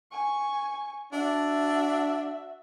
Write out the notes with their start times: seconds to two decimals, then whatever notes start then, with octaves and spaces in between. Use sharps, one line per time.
0.11 G#5 C#6
1.12 D4 F#4 E5